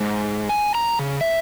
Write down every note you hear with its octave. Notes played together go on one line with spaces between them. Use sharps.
G#2
G#5
A#5
C#3
E5